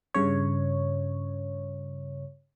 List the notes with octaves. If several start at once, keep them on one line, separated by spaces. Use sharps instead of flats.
G2 C#3 C#5